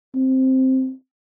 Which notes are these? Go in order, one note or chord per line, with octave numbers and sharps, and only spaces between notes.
C4